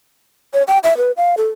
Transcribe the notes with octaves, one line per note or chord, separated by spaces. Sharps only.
C#5
G5
E5
B4
F5
A4